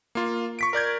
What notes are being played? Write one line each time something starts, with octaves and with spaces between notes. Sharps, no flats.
A#3 F4
C#6 B6 D7
A#4 D5 G6 G#6